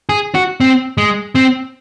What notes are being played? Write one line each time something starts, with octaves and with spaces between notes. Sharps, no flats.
G#4
F#4
C4
G#3
C4